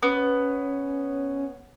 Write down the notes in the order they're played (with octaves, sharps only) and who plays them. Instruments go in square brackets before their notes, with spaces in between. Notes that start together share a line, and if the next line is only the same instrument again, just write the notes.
[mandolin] B3 [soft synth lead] C#4